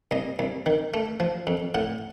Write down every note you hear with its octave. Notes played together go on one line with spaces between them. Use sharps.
C2 D#5
C2
D#3
A3
F3
F2
A2 F#5